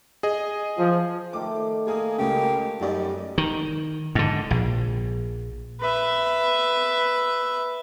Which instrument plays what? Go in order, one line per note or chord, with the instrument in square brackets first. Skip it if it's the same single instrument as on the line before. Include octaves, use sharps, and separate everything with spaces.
[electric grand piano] G#4 D#5
[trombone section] F3
[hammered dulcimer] D#3 A3 C5 [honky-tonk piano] D6
[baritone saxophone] A#3 [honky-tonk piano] G#4 G#5 D#6
[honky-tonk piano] C#2 C#3 [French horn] A#3 [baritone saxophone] G4
[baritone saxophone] F#2 [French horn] G3 [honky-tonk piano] D#4 D5 D#5
[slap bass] D#3
G#2 D3
A#1
[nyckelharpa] B4 E5